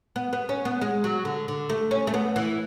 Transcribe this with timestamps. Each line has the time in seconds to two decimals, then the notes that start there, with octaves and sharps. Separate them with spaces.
0.16 B3
0.33 B3
0.49 C#4
0.65 B3
0.81 G#3
1.04 F#3
1.25 D3
1.48 D3
1.69 A3
1.91 C#4
2.07 A3
2.14 B3
2.36 E3